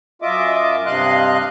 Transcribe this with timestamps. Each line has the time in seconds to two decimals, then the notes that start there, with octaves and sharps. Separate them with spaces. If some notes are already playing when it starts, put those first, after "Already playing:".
0.22 F#2 F4 D#5 E5 D6
0.86 G2 C3 D#5 F5 C6 F#6